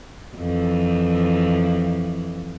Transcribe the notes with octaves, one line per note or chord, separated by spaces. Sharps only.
F2 E3